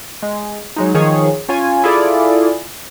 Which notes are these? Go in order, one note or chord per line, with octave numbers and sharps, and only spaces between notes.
G#3
F#3 G#3 D#4
D#3 F3 G#4 C#5
C#4 F4 C#5 G#5
E4 F4 G#4 A4 D5